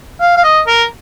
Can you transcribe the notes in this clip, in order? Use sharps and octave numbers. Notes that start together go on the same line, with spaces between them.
F5
F5
D#5
A#4